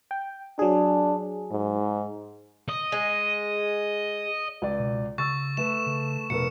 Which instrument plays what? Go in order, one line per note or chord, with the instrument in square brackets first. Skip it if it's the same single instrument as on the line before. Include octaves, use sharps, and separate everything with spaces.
[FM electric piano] G5
[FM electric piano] F#3 G#4 [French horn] D4
[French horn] G#2
[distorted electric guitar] D#5
[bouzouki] G#3
[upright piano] C#2 D5
[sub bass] B2
[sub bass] C#3 [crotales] C#6 [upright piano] E6 A6
[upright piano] A3 A4 B4 [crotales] E7
[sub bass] C#3
[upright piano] F1 B3 A#4 [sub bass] B2 [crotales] C#7